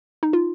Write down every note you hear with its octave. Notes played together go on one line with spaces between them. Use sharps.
D#4
F4